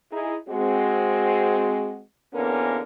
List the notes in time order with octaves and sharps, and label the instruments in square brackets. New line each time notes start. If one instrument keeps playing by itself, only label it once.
[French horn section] D#4 E4 G#4
G#3 C4 F#4
E2 D3 A#3 B3 C#4 A#4